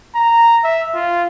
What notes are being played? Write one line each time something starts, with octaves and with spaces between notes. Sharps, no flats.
A#5
E5
F4